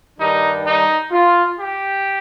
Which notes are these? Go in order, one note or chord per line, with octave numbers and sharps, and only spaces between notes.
G2 D#3 G3 D4 D#4
D#4
F4
G4